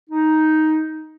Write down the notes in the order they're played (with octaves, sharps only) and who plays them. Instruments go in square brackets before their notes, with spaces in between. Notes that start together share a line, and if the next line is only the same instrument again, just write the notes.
[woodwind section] D#4